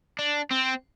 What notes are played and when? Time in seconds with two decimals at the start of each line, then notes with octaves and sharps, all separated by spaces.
0.19 D4
0.51 C4